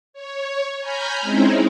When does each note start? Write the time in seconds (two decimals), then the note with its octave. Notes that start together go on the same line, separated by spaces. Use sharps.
0.13 C#5
0.81 G#5 A#5 B5 F6 G6
1.21 G#3 C4 C#4 D#4 E4